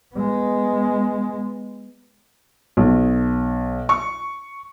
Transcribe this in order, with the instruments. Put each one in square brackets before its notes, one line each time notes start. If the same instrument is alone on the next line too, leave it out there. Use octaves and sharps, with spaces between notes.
[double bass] G#3 B3
[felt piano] B1
C#6